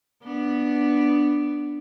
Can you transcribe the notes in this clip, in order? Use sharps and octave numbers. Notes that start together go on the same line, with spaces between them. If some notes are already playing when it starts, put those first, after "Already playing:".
B3 D4